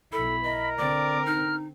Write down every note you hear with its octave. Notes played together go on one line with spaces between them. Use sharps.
B1 E4 A4 B5
A#4 D#5
D3 C4 D5 D6
D#4 F6